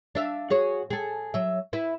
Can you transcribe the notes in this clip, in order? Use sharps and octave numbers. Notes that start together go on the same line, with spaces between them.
D4 E5 F5
F#4 G#4 C#5
G#4 A4
F#3 E5
E4 B4 E5